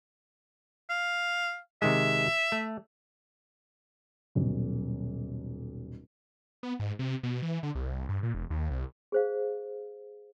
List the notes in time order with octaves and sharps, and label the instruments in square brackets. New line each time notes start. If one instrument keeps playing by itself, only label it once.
[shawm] F5
[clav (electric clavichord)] C3 D#3 G#3 [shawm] E5
[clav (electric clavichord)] A3
[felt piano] D#1 B1
[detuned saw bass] B3
G#2
C3
B2
E3
D3
C2
G2
A#2
E1
D#2
C2
[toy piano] G#4 C5 F5